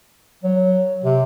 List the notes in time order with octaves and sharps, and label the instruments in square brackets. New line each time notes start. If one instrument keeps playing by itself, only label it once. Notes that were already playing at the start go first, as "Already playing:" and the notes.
[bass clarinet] F#3
C3